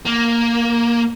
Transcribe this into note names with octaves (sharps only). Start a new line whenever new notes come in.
A#3